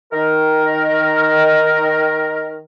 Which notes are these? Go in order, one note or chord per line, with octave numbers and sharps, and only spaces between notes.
D#3 A#4